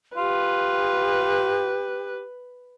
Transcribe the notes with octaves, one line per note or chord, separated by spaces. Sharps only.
F4 G4 B4